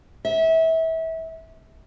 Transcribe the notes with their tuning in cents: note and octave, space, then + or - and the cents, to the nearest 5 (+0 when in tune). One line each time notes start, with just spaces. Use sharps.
E5 -25